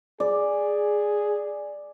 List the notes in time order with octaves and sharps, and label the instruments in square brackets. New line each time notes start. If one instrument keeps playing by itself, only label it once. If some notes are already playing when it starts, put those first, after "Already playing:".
[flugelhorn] G#4 [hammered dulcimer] D5